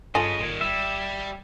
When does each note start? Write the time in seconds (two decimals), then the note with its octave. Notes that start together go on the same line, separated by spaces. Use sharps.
0.15 G2 C#3 F4 A4 D#5 G#5
0.40 G#1 A#2 D#3 G#6
0.61 G3 E5